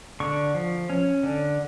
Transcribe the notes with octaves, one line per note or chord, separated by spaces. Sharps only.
D3 C#6
F3
C#4
D3